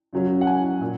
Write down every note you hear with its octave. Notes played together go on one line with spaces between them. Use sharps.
F#2 C#3 F#3 C#4
F#5
G#5
A#2